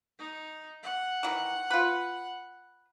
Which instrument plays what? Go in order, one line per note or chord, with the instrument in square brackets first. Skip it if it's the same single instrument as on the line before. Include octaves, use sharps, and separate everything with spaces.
[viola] D#4
F#5
[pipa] D#3 E3
F4 B4